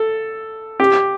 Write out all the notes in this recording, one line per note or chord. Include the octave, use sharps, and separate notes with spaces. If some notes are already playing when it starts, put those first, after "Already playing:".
Already playing: A4
G4